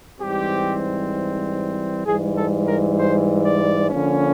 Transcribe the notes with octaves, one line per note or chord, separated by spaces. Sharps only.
G#2 E3 G3 C4 G4
G#2 E3 G3 G#4
A4
A#4
C5
D5
D3 F3 A#3 C#4